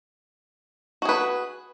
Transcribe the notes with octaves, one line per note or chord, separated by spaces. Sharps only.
F#4 G#4 B4